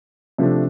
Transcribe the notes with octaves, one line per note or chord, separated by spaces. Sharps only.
C3 F3 A3 D4